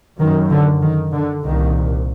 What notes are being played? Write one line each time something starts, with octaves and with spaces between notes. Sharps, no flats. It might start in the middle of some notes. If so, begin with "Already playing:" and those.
F#2 D#3
D3
D#3
D3
C2 A#2 D#3